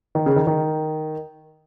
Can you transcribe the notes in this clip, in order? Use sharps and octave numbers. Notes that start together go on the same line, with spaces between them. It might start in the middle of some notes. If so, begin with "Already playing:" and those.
D#3
C#3
D#3
D#3